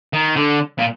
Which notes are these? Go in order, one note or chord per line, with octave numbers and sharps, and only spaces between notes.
D#3
D3
A#2